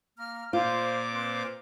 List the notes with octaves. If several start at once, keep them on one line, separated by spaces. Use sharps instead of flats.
A#3 A#5 F6
A#2 F4 C5 D6
C4 B4 C5